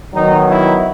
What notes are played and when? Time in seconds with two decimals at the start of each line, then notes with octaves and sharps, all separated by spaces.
0.14 D#3 F#3 B3 D#4
0.49 E4